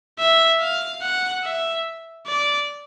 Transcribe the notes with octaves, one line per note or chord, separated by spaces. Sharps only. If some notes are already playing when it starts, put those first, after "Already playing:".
E5
F5
F#5
E5
D5